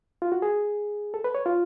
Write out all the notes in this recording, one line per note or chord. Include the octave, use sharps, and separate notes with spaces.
F4
F#4
G#4
A4
B4
C#5
F4